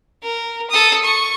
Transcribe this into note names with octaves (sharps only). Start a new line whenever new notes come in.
A#4
A4 D#6
C#6